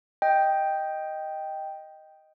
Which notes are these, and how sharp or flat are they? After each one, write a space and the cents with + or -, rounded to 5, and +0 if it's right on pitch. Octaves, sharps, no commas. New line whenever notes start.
D#5 +0 G5 +0